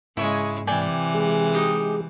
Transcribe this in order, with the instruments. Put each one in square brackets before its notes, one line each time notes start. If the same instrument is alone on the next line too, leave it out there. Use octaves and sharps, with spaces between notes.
[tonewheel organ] G#2 [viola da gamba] C#3 G#3 [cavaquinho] E4 C#5 G#5
[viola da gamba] C3 E3 [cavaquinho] D5 G5 G#5
[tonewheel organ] G#3 G#4
[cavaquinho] D#4 G4 D#6